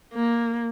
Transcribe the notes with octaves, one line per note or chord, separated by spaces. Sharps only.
A#3